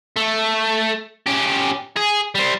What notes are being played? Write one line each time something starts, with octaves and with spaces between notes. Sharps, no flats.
A3
C#4 G4
G#4
G3 C4